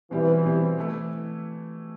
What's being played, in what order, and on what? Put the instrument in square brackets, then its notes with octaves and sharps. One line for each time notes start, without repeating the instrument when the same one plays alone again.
[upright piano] B2 G3 C4 G4 [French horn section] E3
[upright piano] B2 G3 C4 G4
E3 A3 E4